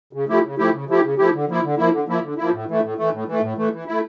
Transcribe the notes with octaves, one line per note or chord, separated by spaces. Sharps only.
C#3
F3 A3 E4 G4
C#3
F3 A3 E4 G4
C#3
F3 A3 E4 G4
C#3
F3 A3 E4 G4
D3
F3 A#3 E4
D3
F3 A#3 E4
D3
F3 A#3 E4
D3
F3 A#3 E4
A2
E3 A3
A2
E3 A3
A2
E3 A3
A2
E3 A3
E3
A3 E4